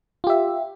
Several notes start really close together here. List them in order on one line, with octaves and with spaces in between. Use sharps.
F4 G4 E5